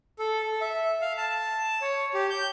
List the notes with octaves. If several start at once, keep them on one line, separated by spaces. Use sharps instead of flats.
A4
A4
E5
F5
A5
C#5
G4
G6